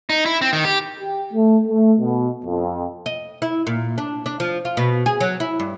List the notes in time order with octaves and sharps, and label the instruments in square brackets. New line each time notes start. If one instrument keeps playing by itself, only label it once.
[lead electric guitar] D#4
E4
C4
D#3
G4
[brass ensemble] G4
A3
A3
B2
F2
[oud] D#5
E4
A#2
D4
D4
F3
F4
B2
G#4
F#3
E4
G2